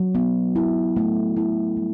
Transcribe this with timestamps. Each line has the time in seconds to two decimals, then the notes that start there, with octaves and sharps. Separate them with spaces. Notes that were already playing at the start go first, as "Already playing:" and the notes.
Already playing: F#3
0.15 B3
0.55 E4
0.97 A3
1.37 E4
1.77 G3